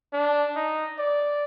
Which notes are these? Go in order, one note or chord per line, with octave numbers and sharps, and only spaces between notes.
D4
D#4
D5